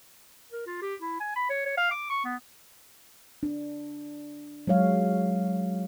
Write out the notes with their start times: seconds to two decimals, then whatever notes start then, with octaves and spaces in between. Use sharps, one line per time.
0.52 A#4
0.66 F4
0.82 G4
1.02 E4
1.20 G#5
1.36 B5
1.49 C#5
1.66 C#5
1.77 F5
1.91 D6
2.10 C#6
2.25 B3
3.43 D4
4.67 F#3 G#3 C#5 F5